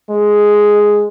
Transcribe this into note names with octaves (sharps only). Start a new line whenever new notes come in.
G#3